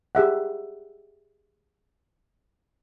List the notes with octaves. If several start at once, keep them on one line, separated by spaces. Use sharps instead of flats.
G4 G#4 E5 F#5